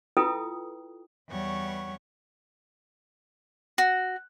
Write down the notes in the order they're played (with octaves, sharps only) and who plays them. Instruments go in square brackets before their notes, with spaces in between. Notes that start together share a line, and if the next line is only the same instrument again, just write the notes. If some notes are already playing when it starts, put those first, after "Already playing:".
[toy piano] E4 F4 A4 B4 G5 D#6
[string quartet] E2 G3 C#5 F#5 C#6
[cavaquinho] F#4